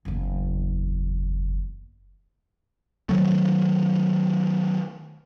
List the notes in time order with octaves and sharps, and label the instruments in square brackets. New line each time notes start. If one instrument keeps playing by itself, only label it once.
[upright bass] F#1 E2
[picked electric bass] D#3 F#3 A3